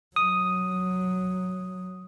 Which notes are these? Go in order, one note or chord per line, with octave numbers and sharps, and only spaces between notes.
F#3 D#6